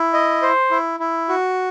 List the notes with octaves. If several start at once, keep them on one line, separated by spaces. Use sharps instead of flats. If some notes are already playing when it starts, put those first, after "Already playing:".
Already playing: E4
D#5
C5
E4
E4
F#4